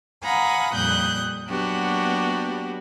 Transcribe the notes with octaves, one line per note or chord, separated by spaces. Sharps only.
F5 F#5 G#5 A#5 B5 D#6
F2 A#2 G3 D#6 F#6 G6
F#3 A#3 B3 D4 F#4 G4